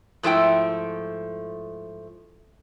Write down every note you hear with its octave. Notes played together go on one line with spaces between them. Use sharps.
G#2 F3 A3 E4 G5